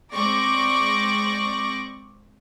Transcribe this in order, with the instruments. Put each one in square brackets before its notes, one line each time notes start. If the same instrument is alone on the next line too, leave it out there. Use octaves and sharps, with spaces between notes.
[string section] G#3 C4 D5 C#6 D6 A#6